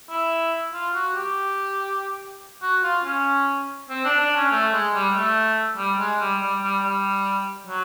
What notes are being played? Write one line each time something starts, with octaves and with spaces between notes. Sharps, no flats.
E4
F4
F#4
G4
F#4
F4
C#4
C4
D4
D4
C#4
A3
G#3
G3
A3
G3
G#3
G3
G3
G3
G3
F#3